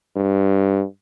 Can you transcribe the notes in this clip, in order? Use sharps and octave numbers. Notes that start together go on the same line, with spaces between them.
G2